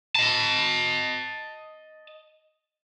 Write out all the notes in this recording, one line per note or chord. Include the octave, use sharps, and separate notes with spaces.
D#5 A5